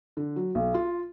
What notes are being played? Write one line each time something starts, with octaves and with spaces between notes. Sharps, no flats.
D3
F#3
B1
F4